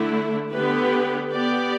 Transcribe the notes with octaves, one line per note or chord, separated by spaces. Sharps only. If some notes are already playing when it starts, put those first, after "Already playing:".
Already playing: D3 A3 E4
D3 B3 G4 B4
B3 G4 D5